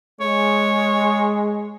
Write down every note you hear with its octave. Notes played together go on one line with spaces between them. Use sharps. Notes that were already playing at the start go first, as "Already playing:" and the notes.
G#3 C#5